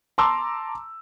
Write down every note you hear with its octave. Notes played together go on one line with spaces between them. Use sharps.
A5 A#5 C6 D6 E6